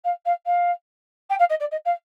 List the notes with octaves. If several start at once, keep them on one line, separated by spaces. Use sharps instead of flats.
F5
F5
F5
G5
F5
D#5
D5
D#5
F5